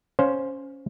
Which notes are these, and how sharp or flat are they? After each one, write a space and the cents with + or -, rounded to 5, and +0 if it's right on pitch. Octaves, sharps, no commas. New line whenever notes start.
C#4 +0 C5 +0 F5 +25